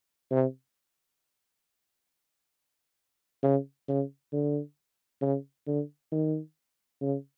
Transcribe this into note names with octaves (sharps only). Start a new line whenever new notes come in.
C3
C#3
C#3
D3
C#3
D3
D#3
C#3